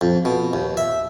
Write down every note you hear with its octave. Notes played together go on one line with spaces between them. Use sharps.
F2
B2
D#2
E5